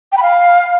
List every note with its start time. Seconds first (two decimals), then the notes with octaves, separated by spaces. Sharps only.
0.12 G5
0.17 B5
0.23 F5